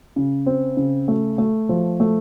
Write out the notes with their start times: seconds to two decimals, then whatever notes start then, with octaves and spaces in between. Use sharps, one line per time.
0.16 C#3
0.46 C4
0.77 C#3
1.08 A3
1.38 A3
1.69 F3
2.00 A3